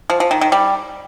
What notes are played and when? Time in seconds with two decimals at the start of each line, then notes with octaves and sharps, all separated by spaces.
0.10 F3
0.20 F3
0.31 D#3
0.41 D#3
0.52 G3